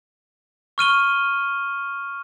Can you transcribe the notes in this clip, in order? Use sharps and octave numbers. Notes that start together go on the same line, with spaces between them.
C#6 F6 D#7 G7